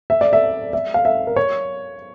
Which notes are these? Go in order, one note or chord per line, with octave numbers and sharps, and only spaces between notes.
E5
D5
E5
E5
F5
E5
A#4
C#5